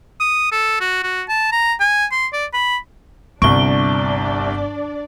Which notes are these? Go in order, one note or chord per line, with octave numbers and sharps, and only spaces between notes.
D#6
A4
F#4
F#4
A5
A#5
G#5
C6
D5
B5
G1 C2 C3 D4 D5 C#6 D7 G7